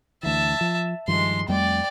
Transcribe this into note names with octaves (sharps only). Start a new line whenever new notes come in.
D2 E3 E5 A5
F3
G2 D#3 F3 G#3 C6
F2 G3 A3 D5 G5